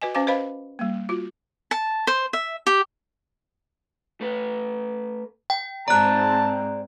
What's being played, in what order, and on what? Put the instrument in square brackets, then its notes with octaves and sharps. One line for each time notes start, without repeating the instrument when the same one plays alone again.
[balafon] F#4 B4 D#5 G#5
C#4 C5 F5 G#5 D6
B4 C5 D#5 F5 B5
G3 A#3
F4 F#4
[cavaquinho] A5
C5
E5
G4
[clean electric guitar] A3 B4
[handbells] G5
[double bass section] G#2 C4 [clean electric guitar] G#4 D5 [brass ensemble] A5 [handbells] A#5 F#6